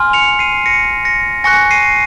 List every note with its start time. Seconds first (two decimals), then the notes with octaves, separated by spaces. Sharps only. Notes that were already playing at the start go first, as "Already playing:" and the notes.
Already playing: G#5 C6 F6
0.13 C#7 F7
0.39 C7 D#7
0.66 A#6 C#7
1.05 A#6 C#7
1.44 G#5 C#6 F#6 A#6 C#7
1.71 C7 D#7